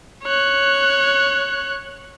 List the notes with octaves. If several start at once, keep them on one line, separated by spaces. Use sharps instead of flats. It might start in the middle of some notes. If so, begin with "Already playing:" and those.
C#5 F#6